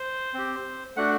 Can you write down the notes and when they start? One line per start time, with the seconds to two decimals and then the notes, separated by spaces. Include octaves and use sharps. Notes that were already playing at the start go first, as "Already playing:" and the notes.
Already playing: C5
0.34 C4 G4
0.96 A3 D4 F#4 F#5